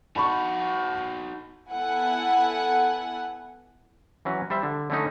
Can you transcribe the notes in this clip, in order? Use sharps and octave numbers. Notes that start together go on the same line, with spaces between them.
D#4 F#4 A5 B5 C#6
B3 E4 A4 F#5 G#5
E3 F#3 C#4
G3 C5 E5
D3
D3 A3 C#4 D#4